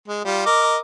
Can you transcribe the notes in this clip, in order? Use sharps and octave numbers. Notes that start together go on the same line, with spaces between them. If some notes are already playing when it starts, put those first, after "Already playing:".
G#3
G3 F4
A#4 D#5 D6